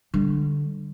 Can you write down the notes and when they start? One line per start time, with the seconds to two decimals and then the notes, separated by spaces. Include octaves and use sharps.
0.14 D3 G3